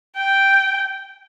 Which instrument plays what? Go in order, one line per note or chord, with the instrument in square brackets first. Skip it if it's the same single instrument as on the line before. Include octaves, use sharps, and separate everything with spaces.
[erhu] G5